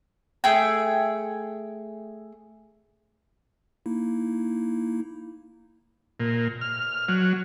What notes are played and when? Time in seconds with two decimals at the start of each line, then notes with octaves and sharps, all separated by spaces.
0.44 A3 G#4 G5
3.86 A#3 D#4 E4
6.20 A#2
6.61 F6
7.08 F#3